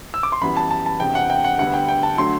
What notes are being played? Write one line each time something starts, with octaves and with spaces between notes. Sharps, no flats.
E6
D6
C6
F#2 E3 G3 B3 B5
A5
A5
A5
E1 E2 C3 G5
F#5
G5
F#5
D2 D3 G3 B3 F#5
G5
G5
A5
D3 F#3 A3 C6